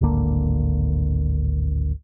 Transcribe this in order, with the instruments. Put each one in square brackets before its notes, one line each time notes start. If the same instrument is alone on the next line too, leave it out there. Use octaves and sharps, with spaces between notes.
[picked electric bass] D1 G#1 D3 A#3